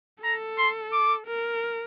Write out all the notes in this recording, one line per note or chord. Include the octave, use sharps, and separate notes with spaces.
A4 A#5
C6
D6
A#4